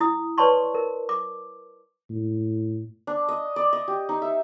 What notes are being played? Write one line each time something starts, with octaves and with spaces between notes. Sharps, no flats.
E4 D#6
B4 C#5 D5 A5 C6 C#6
A#4
D6
A2
D4
D#5
D5
D#5
G4
D#4
E5